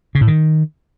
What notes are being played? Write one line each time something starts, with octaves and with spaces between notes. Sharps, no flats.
C#3
A2
D#3